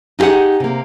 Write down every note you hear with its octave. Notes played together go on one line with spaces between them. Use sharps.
D#4 F4 G4 G#4 F#5
C3 A#3